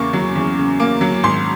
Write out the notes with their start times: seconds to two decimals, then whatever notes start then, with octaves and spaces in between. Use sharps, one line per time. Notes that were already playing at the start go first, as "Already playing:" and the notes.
Already playing: E2 C#3 A#3 C#6
0.13 F#3
0.35 E2
0.58 C#3
0.80 A#3
1.01 F#3
1.23 G#1 C6